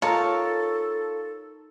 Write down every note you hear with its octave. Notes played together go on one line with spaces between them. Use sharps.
D#4 F4 A4 A#4 C#5 A5